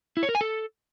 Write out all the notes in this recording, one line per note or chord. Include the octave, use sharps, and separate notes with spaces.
E4
C#5
A#4
G#5
A4